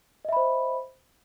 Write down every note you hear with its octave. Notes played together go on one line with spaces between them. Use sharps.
C5 D#5 E5 B5